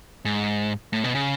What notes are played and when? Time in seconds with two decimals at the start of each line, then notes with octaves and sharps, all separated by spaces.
0.25 G#2
0.93 A2
1.04 B2
1.15 C#3